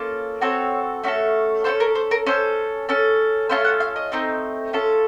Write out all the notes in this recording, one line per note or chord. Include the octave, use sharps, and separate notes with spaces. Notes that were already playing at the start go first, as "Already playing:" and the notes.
Already playing: A#3 C#4 F4 A4
C4 F#4 A4 C#5
A3 C#4 F#4 A4
C#4 F4 A4 C5
A#4
C5
A#4
C#4 A4 C5
C#4 A4
A3 C#4 F4 A4 C5
F#5
F5
D#5
A3 C4 D#4
C#4 F4 A4